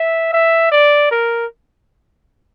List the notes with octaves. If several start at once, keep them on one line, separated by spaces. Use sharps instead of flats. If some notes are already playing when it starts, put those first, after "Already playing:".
Already playing: E5
E5
D5
A#4